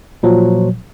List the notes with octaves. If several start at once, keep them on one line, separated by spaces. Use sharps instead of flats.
A#2 F3 F#3